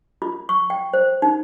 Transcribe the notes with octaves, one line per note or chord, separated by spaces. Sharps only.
F4
C#6
G5
C5
D#4